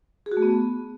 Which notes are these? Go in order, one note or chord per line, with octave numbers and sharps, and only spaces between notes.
G#4
F#4
A3
B3